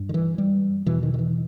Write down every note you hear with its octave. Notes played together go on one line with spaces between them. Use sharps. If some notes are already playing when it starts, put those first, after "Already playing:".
Already playing: G2
D#3
E3
G3
E2 B2 E3
D#3
D#3
E3